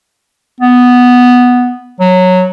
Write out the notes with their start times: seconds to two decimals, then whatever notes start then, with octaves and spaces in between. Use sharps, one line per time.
0.60 B3
2.00 F#3